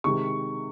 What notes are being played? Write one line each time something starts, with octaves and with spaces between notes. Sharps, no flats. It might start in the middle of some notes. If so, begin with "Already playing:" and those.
C3 D#3 G#3 C#6